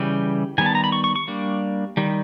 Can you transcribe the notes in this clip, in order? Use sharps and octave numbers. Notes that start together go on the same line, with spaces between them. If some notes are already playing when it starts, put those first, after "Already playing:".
Already playing: C#3 E3 G3 G5
D#3 G3 B3 G#5
A5
A#5
B5
C#6
C#6
C#6
G3 A#3 D4
D#3 G3